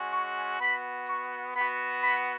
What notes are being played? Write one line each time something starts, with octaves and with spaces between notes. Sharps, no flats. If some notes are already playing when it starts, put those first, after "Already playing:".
Already playing: G#3 C#4 F#4
C#6
B3 F#4 B5
C#6
B3 F#4 B5
B5